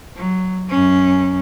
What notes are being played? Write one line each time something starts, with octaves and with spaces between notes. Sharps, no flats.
F#3
F#2 C#4